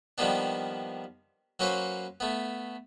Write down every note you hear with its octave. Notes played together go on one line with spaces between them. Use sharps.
D#3 F3 G3 A#3 B3 D4
F#3 A#3 C#4 B4 C5
A3 B3